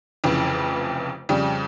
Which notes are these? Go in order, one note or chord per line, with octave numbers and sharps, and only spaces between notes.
F1 F2 C#3 E3
F2 C#3 G3